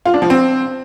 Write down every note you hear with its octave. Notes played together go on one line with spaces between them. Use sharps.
F4
D4
F3
C4